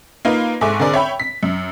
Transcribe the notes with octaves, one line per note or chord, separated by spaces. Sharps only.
A#3 D#4 F4 B4
G#2 A4 E5 G#5 C#6 D6
D3 C4 G#4 A#4 D5
C#5 E5 G5 B5
B6
F#2